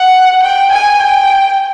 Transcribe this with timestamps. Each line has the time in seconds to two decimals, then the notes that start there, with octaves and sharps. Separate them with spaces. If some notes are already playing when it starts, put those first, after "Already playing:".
Already playing: F#5
0.43 G5
0.72 G#5
1.00 G5